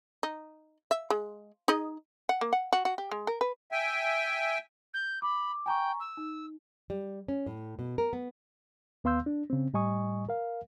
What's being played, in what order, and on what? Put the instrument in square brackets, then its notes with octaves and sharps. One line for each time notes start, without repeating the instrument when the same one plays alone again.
[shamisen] D#4
E5
G#3
D#4 G#4 D#5
F#5
A#3
F#5
F#4
F#4
G4
G#3
A#4
B4
[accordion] E5 G5 G#5
[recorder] G6
[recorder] B5 [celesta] D6
[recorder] G5 [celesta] G#5 A#5 C#6
[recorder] E6
[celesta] D#4
[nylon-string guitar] G3
C#4
A2
B2
A#4
B3
[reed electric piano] D#2 B3 F5 C6 E6 G6
D4
C#3 C4
A2 G3 D#5 G#5 C#6 D#6
A#4 F5